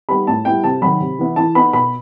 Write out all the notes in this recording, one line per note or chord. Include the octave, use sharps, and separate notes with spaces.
G3 B3 D#4 B5
A2 A5
G3 B3 E4 G5
C3 A5
D#3 F#3 B5
C3
E3 B3 E4
E3 A5
B3 D#4 B5
B2 B5